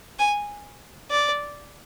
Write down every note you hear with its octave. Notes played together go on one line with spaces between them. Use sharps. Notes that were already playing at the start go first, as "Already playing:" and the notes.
G#5
D5